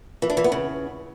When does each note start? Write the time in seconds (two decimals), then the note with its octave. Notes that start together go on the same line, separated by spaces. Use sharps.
0.22 E3
0.30 D4
0.37 E3
0.44 B3
0.52 C#3